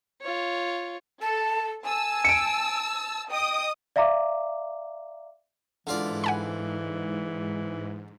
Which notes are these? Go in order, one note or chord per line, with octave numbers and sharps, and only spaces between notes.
F4 C#5
A4 A5
G#5 A5 E6
C#7 D7
D#5 G5 D#6
D5 E5 F5 A#5 D6
G#2 D3 E3 F4 D5
F#5 G#5 B5